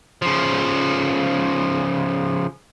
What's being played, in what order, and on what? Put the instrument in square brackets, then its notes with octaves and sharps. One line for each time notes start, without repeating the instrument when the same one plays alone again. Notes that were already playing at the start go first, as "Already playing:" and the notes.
[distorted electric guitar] C#3 F3